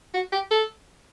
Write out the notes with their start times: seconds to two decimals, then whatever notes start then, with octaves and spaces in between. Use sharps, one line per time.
0.14 F#4
0.32 G4
0.51 A4